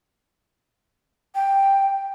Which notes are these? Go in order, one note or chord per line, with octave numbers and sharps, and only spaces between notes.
G5